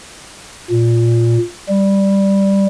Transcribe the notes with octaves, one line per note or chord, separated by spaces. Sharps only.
A#2
G3